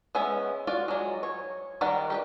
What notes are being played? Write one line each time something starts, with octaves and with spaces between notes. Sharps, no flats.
G#3 B3 C#4 E5
F4 F#4 D5
F#3 G#3
C#5
D#3 G3 A#4 D5 F#5
G4 A#4 B4